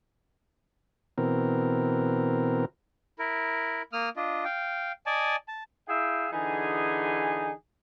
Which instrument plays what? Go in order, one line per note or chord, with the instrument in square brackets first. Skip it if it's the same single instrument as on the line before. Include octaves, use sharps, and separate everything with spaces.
[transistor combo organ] B2 E3 C4 A#4
[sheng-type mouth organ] E4 A#4
A#3 D#6 F6
D4 F4 D#5
F5 G5
D5 D#5 G#5 A5
A5
[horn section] E4 G#4 E5 F5 G5
D3 E3 D#4 G#4